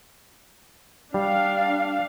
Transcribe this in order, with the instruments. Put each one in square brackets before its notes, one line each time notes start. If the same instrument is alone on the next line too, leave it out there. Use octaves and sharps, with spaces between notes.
[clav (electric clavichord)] G3 [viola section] D4 F5